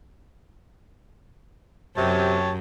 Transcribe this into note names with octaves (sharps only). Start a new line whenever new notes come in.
F#2 C3 G4 C#5 A5